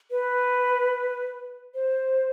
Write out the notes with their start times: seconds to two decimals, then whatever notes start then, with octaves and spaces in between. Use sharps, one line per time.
0.11 B4
1.74 C5